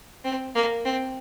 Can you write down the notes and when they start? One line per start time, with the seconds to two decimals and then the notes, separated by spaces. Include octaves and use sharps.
0.25 C4
0.55 A#3
0.85 C4